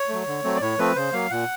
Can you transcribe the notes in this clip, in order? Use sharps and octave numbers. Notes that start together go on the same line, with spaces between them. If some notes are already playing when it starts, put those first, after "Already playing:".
Already playing: C#5
F#3 A3
D3
F#3 A3 C4
D5
A2 C#5
F3 A3 C4 B4
C#3 C5
F#3 A#3 F5
A#2 F#5